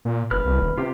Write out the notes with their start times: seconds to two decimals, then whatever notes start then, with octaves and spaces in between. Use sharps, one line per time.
0.05 A#2
0.31 F#1 B4 F6
0.45 C2
0.60 D#1
0.78 C3 F4 G4